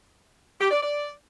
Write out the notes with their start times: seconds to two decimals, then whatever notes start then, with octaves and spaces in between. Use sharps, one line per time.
0.60 G4
0.70 D5
0.81 D5